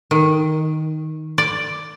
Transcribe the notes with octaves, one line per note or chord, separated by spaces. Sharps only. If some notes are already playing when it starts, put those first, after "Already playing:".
D#3
D5